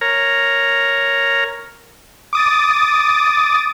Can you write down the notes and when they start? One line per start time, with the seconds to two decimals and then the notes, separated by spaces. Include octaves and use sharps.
0.01 A#4 C#5 A#5
2.33 D6 D#6 A6